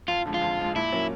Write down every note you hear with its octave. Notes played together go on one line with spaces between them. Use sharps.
F2 F4
D3 F3 G#3
F4
F2
D3 F3 G#3
A#2 E4
F#3 A#3 C#4